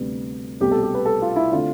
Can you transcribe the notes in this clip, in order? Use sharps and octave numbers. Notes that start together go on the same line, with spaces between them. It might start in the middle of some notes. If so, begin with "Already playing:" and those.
Already playing: D2 C3 G3 B3
C2 B2 A3 C4 G4
A4
G4
B4
A4
F4
E4
D3 A3 C4 F4